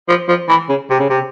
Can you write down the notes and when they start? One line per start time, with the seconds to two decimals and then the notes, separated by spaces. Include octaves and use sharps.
0.09 F3
0.28 F3
0.49 E3
0.69 C#3
0.90 C3
0.99 C#3
1.10 C3